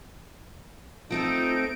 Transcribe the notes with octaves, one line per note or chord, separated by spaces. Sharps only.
A3 C4 D#4 F4 A4 D7